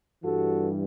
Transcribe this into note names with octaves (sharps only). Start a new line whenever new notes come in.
G2 E3 G3 F#4 A4